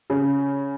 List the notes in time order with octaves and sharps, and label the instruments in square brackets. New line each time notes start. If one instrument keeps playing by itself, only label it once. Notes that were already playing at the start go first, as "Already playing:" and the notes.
[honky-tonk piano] C#3